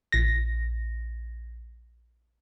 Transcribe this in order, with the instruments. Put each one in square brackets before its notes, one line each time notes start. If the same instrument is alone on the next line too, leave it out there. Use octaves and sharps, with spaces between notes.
[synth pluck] A#1 A#6